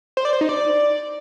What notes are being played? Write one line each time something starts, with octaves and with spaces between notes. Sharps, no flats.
C5
D5
C5
D#4
D5